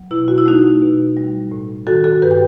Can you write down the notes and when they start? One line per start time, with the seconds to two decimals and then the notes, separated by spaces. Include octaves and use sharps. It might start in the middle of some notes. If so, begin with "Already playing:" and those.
Already playing: F#3
0.11 B2 E4
0.28 F#4
0.38 E4
0.46 A3 D#4 F#4
0.82 B2
1.17 G3
1.51 A2
1.87 D#3 F#4 A4
2.04 F#4 A4
2.22 G2 G4 B4
2.31 G5